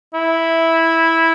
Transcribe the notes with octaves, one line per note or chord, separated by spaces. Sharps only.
E4